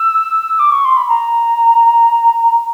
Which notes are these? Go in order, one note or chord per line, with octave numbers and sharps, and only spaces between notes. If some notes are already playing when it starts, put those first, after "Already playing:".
Already playing: E6
D6
C#6
C6
B5
A#5